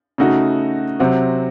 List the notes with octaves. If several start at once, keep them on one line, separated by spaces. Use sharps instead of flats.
C#3 A3 D#4 F#4
C3 F#3 C4 F#4